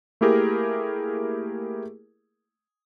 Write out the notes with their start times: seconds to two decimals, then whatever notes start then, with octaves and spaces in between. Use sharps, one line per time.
0.21 A3 A#3 E4 G4 G#4 A#4